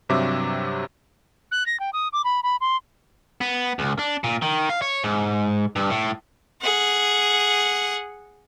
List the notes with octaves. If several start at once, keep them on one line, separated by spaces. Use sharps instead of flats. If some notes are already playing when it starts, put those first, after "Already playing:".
G2 C3 F#3 E5 D6
F#6
A#6
G5
D#6
D6
B5
B5
C6
B3
C#2
D4
A#2
D#3
F5
C#5
G#2
G2
A2
G#4 F#5